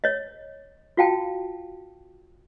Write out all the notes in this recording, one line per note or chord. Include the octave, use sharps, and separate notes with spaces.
C#5 D#5
F4 F#4 F5 G5 A5